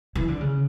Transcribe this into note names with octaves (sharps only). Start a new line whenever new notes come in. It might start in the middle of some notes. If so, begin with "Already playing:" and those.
E3
D3
C#3